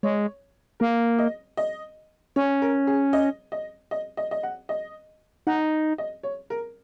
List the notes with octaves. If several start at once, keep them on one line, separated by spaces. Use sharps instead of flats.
G#3 C#5
A#3 A#4
D#5
D#5
C#4 C#5
A#4
G#4
D#5
D#5
D#5
D#5
D#5
F#5
D#5
D#4 F#5
D#5
C#5
A#4